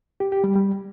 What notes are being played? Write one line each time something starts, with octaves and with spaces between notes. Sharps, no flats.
G4
G4
G3
G3